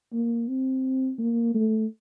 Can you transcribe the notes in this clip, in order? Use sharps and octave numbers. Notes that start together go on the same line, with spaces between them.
A#3
C4
A#3
A3